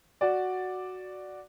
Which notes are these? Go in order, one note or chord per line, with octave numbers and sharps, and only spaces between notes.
F#4 D5